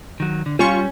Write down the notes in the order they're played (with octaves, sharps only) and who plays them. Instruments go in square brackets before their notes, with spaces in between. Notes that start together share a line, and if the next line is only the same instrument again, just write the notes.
[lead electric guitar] D#3 F#3
D3
[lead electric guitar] G3 [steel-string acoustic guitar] C#4 [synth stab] F4 C#6